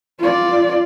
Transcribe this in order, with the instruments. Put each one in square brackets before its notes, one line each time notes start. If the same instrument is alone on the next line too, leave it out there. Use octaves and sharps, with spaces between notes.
[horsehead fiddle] F4 D5